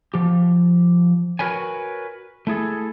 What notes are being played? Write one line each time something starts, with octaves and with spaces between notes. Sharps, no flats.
F3 G4
F#4 A#4 B4 C#5 G#5
A3 E4 G#4 A4